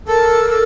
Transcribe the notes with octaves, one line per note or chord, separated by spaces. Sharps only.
A4 A#4
A4